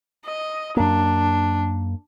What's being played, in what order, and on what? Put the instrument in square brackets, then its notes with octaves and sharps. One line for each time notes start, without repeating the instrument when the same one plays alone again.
[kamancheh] D#5
[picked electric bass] F#2 A#3 [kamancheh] D4